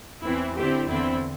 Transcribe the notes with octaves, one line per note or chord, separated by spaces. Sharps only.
E2 E3 C4 E4
D3 C4 E4 G4
E2 D3 C4 E4